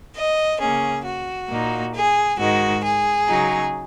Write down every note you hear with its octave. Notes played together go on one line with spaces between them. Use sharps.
D#5
C#3 A#3 C#4 G#4
F#4
A#2 A#3 D#4
G#4
G#2 D#3 G#3 F#4
G#4
C#3 F#3 D#4